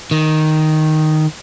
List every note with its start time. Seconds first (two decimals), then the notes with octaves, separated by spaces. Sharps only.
0.11 D#3